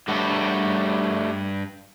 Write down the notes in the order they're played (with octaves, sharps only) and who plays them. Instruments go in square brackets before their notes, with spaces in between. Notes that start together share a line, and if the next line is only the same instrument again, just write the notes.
[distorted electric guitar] G2 [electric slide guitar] G3 A3 F#4